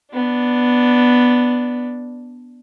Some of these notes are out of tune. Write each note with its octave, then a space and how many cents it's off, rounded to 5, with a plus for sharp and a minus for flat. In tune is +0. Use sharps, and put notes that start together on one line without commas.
B3 +0 D4 +0